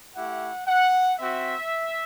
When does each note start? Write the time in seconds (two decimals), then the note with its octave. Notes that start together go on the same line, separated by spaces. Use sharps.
0.15 A3 E4 G4 F#5
0.68 F#5
1.19 C4 F#4 E5